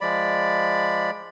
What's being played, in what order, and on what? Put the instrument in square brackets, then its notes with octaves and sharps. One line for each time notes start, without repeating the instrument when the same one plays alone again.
[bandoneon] F3 G#3 D5 B5